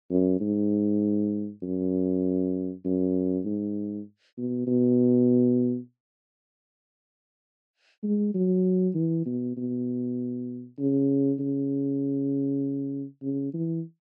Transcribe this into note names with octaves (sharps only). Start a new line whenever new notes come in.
F#2
G#2
F#2
F#2
G#2
B2
B2
G#3
F#3
E3
B2
B2
C#3
C#3
C#3
E3